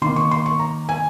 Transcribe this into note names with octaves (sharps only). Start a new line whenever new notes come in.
D#3 A#3 C6
C#6
C6
C#6
A#5
G#5